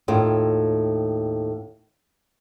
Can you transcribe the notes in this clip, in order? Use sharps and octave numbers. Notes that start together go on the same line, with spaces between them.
D#2 A2 F4